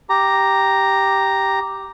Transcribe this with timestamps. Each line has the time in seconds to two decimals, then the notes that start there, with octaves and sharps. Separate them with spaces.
0.10 G4 A#5